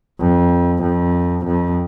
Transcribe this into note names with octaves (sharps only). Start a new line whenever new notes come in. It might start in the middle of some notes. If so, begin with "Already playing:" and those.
F2
F2
F2